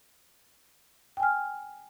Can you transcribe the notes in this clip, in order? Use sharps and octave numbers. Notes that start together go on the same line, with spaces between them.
G5 G#5 F6